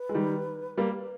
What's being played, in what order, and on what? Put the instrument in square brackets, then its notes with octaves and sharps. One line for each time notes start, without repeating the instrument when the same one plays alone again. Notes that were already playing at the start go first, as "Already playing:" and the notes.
Already playing: [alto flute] B4
[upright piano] G#3
D#3 G3
G3 A#3